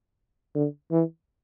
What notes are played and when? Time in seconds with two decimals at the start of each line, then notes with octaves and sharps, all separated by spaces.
0.55 D3
0.91 E3